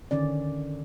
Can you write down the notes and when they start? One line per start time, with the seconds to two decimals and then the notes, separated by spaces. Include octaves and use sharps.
0.11 D3 D#3 C#4 D5